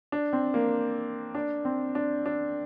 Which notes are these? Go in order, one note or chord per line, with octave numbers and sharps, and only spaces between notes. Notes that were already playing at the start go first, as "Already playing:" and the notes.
D4
C4
A#3
D4
C4
D4
D4